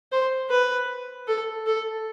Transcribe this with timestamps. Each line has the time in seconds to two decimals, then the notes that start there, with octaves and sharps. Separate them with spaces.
0.12 C5
0.50 B4
1.28 A4
1.67 A4